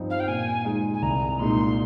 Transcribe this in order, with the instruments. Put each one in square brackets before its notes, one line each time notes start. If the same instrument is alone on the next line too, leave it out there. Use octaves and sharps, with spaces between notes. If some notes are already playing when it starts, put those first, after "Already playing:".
Already playing: [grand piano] G2 F3 C4 D#4
[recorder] F5
G5
[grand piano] A#2 [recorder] G#5
[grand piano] G#3 D#4
[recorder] G#5
[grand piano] C2 [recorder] A#5
[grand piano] A#2 G#3 D#4 [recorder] C6